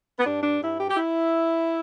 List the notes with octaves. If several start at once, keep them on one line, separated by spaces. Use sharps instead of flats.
B3
G2 D4
D4
G2 E4
G4
G4
E4